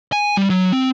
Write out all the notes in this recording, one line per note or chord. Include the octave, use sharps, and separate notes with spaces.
G#5
G3
F#3
C4